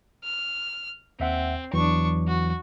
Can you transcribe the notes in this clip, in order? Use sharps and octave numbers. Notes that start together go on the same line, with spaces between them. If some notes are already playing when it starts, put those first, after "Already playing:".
F6
D#2 C4 E5 F#5
E2 E3 F#3 D4 C#6
F#4